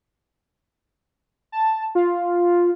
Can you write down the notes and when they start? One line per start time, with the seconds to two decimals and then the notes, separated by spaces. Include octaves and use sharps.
1.52 A5
1.95 F4